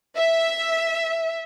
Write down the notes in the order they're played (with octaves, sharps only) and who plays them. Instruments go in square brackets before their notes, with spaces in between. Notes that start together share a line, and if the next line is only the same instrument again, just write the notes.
[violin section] E5